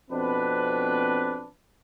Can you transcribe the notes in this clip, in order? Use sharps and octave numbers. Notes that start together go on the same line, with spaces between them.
F2 B2 C4 D4 B4